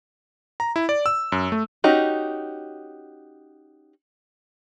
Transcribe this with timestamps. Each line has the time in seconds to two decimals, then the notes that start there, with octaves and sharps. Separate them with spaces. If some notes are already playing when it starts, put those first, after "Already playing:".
0.60 A#5
0.76 E4
0.89 D5
1.06 E6
1.32 F#2
1.52 A3
1.84 C#4 D#4 F#4 G4